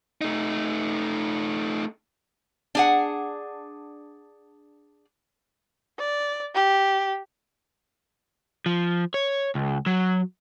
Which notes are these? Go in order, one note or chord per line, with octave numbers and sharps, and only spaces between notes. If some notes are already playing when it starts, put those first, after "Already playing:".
A3 D#4
D4 G#4 F#5
D5
G4
F3
C#5
C#2
F#3